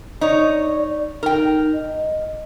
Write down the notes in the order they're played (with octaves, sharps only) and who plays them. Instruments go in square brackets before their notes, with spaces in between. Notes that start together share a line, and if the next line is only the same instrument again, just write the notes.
[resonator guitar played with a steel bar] D#4 C#5 [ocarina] D5
[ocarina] D#4 [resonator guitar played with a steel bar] A#4 G5
[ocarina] D#5